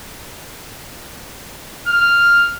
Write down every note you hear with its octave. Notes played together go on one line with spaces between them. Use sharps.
F6